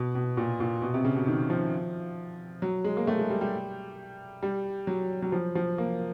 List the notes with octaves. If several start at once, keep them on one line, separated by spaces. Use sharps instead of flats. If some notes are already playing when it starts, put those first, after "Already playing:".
Already playing: B2
B2
A#2
A#2
B2
C3
C#3
B2
D#3
F3
F#3
G#3
A#3
A3
G#3
G3
G3
G3
F#3
F#3
F3
F3
A#3